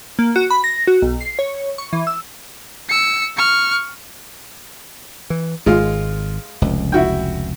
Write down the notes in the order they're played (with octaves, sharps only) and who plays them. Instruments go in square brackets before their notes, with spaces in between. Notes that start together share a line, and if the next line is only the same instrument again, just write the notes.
[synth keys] A#3
F#4
B5
A#6
F#4
B1
C7
C#5
C#6
E3
E6
[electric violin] E6 C#7
C#6 F6
[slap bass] E3
[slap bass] G#1 [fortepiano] G#3 F4
[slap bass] F1 C#2
[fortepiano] E4 F#4 G5